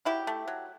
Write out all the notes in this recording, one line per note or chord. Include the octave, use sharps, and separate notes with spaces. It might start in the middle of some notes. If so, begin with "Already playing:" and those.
F#3 E4 G4
A3
F#3